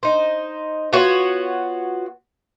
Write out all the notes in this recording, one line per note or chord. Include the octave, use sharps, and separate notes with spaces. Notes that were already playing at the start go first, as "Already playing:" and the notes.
D#4 C5
B3 F4 F#4 C#5